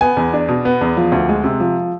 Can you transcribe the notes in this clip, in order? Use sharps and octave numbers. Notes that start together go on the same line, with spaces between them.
B3 G#5
E2
D4
B2
B3
E2
F3
D2
G#3
C3
F3